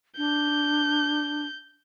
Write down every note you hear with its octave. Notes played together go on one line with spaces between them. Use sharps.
D4 G6